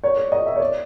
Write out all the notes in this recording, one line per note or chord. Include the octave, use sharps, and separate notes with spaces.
C#5
D5
D#5
E5
C#5
D5